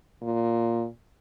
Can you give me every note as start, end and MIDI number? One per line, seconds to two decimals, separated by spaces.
0.22 0.86 46